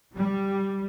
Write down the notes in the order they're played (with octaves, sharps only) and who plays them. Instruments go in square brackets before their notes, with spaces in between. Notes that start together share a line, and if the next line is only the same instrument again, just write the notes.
[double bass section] G3